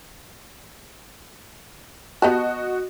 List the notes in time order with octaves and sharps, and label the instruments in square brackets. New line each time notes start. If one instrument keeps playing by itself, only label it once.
[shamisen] B3 G4 A5 [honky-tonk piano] F#4 D#5